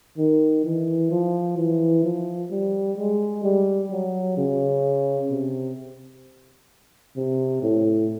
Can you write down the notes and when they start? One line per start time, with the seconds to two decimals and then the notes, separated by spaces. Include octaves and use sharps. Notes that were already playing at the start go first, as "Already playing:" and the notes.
0.18 D#3
0.64 E3
1.11 F3
1.57 E3
2.04 F3
2.50 G3
2.98 G#3
3.44 G3
3.91 F#3
4.37 C#3
5.31 C3
7.16 C3
7.63 A2